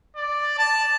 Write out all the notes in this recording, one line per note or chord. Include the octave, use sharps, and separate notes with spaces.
D5
A5